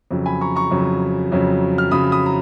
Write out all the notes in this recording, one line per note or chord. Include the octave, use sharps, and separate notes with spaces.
F2 C#3 F#3
G#5 B5
A#5 C#6
A#5 C#6
F2 C#3 F#3
F2 C#3 F#3
F6
F2 C#3 F#3 B5 D#6
B5 D#6
A#5